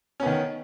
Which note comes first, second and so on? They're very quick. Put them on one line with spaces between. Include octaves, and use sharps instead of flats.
C#4 B3 D#3